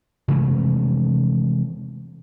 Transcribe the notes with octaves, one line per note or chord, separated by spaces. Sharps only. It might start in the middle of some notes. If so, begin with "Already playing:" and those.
C3 E3 G#3 A3